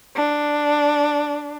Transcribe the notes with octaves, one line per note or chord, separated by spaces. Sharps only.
D4